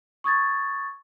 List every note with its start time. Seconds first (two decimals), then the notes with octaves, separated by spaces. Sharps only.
0.24 C#6 D#6 G#6 A6